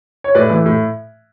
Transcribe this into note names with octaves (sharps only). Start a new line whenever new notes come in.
C#5
A2 B4 D5
E3 A3 E4
A2